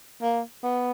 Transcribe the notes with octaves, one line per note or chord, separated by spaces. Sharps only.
A#3
B3